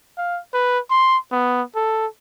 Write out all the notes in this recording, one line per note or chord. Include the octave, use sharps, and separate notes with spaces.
F5
B4
C6
B3
A4